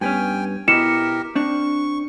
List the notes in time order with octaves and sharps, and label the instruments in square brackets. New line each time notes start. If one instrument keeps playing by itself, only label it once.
[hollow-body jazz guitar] G2 B3 C#4 [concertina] G5 G#5
[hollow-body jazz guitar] B2 E4 D#5 [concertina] G4 A#4 [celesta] C#7 E7
[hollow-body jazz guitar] C4 D4 [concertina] C#6